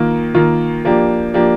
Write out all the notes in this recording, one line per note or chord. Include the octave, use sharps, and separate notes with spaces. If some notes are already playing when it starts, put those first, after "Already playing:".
Already playing: D#3 A#3 F4
D#3 A#3 F4
F3 A#3 D4 G4
F3 A#3 D4 G4